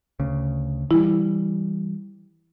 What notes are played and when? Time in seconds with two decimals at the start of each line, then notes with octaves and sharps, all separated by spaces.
0.20 D2 C#3
0.91 E3 G3 E4